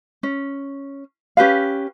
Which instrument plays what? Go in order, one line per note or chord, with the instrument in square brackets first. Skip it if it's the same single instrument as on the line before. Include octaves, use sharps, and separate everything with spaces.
[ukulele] C#4
C#4 G4 B4 F5